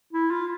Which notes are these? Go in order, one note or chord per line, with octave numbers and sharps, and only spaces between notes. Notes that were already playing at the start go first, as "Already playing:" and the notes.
E4
F4